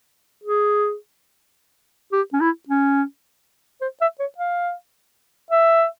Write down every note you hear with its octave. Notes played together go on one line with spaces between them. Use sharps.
G#4
G4
C#4
E4
C#4
C5
E5
C#5
F5
E5